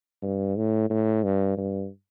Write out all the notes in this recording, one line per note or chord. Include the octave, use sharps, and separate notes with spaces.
G2
A2
A2
G2
G2